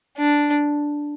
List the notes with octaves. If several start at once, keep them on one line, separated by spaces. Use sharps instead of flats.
D4